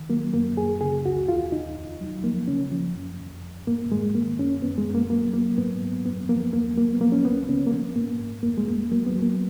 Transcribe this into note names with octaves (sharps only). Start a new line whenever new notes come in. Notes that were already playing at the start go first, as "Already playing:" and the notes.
Already playing: D#3
F#3 A#3
F#2 A#3
F#2 G#4
C#3 G#4
C#2 F#4
D#2 F4
D#2 D#4
F2
F#3
F3 A#3
C#3 C#4
F3
F#2
F2
F2
G#2 A#3
G#2 G#3
D#3 A#3
F#2 C#4
F#2 B3
G#3
F#2
A#3
F#3 A#3
F#3 A#3
G#2 B3
F#3
F#2 B3
F3 A#3
D#2 A#3
F#3 A#3
B3
F3 A#3
C#4
C#2 B3
C#3 C#4
A#3
F3 B3
G#2 A#3
G#2
F2 A#3
G#3
F2 A#3
F#3 A#3
B3
F#3
A#3